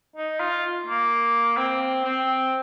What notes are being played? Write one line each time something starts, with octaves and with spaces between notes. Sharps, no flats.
D#4
F4
A#3
C4
C4